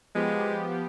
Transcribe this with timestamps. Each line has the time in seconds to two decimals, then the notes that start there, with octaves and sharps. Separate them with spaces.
0.15 F3 G#3 B3 G4